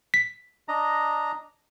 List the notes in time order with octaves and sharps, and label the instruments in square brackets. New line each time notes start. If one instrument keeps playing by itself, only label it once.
[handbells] B6
[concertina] D4 D#5 A#5